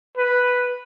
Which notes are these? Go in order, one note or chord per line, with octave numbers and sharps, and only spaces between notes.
B4